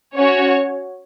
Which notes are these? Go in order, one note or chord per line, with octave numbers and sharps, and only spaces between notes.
C#4 F#4 C#5